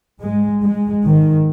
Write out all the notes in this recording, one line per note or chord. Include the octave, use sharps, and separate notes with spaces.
G#2 G#3
G#3
G#2 D#3